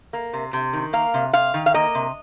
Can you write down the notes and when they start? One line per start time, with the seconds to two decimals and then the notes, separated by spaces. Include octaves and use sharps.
0.13 A#3
0.33 C3
0.53 C3
0.73 D#3
0.93 A#3 F5
1.14 C3
1.33 C3 F5
1.54 D#3
1.66 F5
1.74 A#3 D#5
1.95 C3